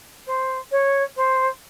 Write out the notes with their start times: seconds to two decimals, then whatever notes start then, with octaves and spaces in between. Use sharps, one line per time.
0.26 C5
0.71 C#5
1.16 C5